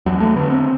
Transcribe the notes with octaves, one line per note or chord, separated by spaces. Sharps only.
E2 F#3
A3
D3 B3
C4